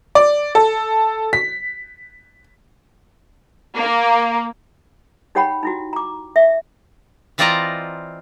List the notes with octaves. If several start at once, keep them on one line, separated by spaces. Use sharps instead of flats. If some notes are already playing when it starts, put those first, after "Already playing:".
D5
A4
B6
A#3
D#4 G4 C#5 F#5 G5 B5
D#4 E4 F#4
A#5 D6
E5
E3 C4 F4 D5 D#5 A#5